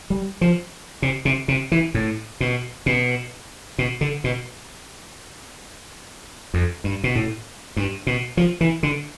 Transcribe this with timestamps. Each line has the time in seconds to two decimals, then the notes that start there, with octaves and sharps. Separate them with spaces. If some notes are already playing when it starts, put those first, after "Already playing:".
0.10 G3
0.41 F3
1.02 C3
1.25 C3
1.48 C3
1.72 E3
1.94 A2
2.41 B2
2.86 B2
3.78 B2
4.01 D3
4.24 B2
6.54 F2
6.84 G2
7.04 B2
7.15 A2
7.77 G2
8.07 B2
8.37 F3
8.61 E3
8.83 D3